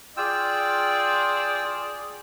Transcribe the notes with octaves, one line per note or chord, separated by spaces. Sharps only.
F4 G#4 D5 G5 E6